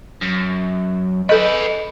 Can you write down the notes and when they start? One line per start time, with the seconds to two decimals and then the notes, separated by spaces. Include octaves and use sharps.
0.22 F#2
1.29 G#4 A4 B4 D#5